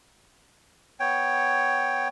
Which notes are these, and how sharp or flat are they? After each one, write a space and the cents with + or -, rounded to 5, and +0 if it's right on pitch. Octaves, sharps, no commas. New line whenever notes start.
B3 +0 C#5 +0 G5 +5